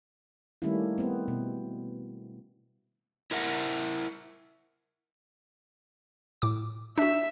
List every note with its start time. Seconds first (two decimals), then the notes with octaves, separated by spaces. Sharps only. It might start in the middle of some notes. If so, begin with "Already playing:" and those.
0.62 D#3 G3 A3 A#3 C#4 E4
0.98 B3 C4
1.28 B2
3.31 E4 A#4 E5 F#5
6.42 A2 D6
6.98 D4 F#4 E5